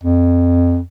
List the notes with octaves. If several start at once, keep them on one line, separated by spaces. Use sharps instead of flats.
F2